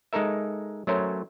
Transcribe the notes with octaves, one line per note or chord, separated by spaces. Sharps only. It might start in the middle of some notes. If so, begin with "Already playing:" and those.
G#3 D#4 A4 A#4 E5
F#3 A3 C#4 A#4 C5